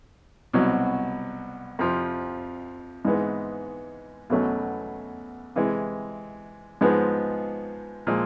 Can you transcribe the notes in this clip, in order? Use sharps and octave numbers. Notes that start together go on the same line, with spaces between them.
C2 B2 F#3
F2 C3 F3
G#2 E3 G#3 B3
E2 B2 F#3 A3 C#4
C3 E3 G#3
G#2 F3 G#3 B3
A#2 F3 G#3